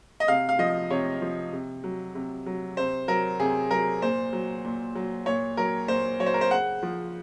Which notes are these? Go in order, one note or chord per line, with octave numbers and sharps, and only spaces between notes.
D#5
C3 F5
F5
F3 D#5
C3 C#5
F3
C3
F#3
C3
F#3
C3 C5
F#3 A#4
C3 G#4
F#3 A#4
A#2 C5
F#3
A#2
F#3
A#2 C#5
F#3 A#4
A#2 C5
F#3 C#5
C5
A#4
C5
C#3 F#5
F3